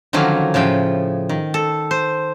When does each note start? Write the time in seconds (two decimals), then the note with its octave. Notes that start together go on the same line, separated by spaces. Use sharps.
0.13 D3 D#3 F3 F#3 A#3 C#4
0.54 A2 C#3 F3 G5
1.29 D#3
1.54 A4
1.91 C5